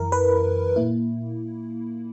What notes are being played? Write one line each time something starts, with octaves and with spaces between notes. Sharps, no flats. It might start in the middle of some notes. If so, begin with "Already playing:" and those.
Already playing: F#2 E3 E4 A#4
B4
A#2 A#3 E4